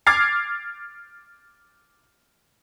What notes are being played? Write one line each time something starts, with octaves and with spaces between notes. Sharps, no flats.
D6 F6 G#6 A6 C7